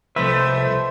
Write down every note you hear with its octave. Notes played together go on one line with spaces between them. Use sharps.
C2 F2 A3 B4 C5 E5